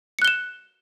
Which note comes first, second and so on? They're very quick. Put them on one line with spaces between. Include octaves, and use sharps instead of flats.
C#7 F#6 G7 E7